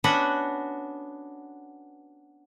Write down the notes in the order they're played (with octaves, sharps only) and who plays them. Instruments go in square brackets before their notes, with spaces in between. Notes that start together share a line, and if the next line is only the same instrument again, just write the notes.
[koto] B3 C#4 D4 F#4 B4 F#5